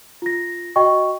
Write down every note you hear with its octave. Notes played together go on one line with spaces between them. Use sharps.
F4 A#6
F#4 D#5 G5 C#6